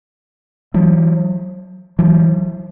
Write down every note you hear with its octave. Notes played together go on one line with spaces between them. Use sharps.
E3 F#3
E3 F#3